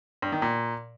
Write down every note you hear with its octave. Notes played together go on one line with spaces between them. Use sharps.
G2
D#3
A#2